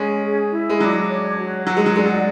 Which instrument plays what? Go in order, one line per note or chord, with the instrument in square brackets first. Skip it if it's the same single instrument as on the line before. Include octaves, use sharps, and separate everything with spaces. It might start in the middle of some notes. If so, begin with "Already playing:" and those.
Already playing: [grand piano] G#3 [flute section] C#4
[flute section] G#4
E4
[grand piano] G#3
[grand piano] F#3 [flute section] D4
[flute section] C#5
F#4
[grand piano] F#3 [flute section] F#5
[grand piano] G#3
F#3
[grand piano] G#3 [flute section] D5
[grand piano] F#3